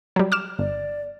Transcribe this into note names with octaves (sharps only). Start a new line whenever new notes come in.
F#3 G3
D6 F6 E7
G1 D5